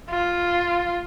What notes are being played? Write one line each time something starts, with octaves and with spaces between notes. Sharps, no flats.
F4